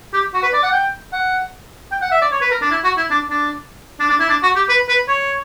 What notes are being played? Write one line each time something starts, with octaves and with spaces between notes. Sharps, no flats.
G4
F#4
B4
D5
F#5
G5
F#5
G5
F#5
E5
D5
C#5
B4
A#4
D4
E4
F#4
E4
D4
D4
D4
D4
E4
D4
F#4
G4
B4
B4
C#5